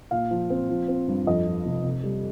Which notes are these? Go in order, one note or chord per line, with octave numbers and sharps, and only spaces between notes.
A#2 F5
F3
C4
F3
C4
G2
F2 D#5
F3
F1
C3
G3